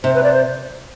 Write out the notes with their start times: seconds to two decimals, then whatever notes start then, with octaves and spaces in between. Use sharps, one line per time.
0.04 C3 C5
0.14 B4
0.23 D5
0.32 C5